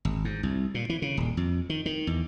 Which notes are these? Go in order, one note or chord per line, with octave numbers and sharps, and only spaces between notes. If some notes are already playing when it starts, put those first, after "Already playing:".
G#1
G#2
C2
A#2
E3
C#3
D#1
F2
D#3
D#3
E2